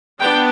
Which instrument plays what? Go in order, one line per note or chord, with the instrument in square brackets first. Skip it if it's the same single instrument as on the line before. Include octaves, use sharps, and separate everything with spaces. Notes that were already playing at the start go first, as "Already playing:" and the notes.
[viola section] B3 D4 G5